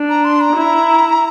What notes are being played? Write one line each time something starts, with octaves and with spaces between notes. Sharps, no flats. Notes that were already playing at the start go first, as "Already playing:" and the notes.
Already playing: D4
A#5
C6
A#5
E4